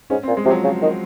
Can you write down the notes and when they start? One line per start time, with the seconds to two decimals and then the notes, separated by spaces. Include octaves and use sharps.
0.10 G#2 C#4
0.23 C4
0.27 A#2
0.37 G#3
0.45 C3 F3
0.50 F#3
0.64 C#3
0.82 D#3